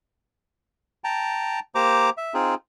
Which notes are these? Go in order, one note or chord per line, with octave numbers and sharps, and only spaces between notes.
G5 A5 A#5
A#3 G4 C5 A#5 D6
E5
C4 D#4 F4 G#4